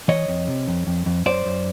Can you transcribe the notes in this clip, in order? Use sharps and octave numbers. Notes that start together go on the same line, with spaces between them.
E3 C#5 D#5
F2
C3
F2
F2
F2
F#2 C5 D5
F#2